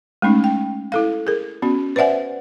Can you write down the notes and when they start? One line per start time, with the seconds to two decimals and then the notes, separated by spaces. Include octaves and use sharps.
0.22 G#3 A3 C#4 D#4
0.44 G5
0.92 E4 A4 F5
1.27 G#4 A#4
1.62 B3 C#4 F#4
1.96 B4 C5 D5 E5 F#5 G#5